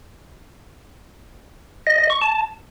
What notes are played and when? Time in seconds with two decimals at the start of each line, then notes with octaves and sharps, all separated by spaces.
1.87 D#5
1.98 D#5
2.10 C#6
2.22 A5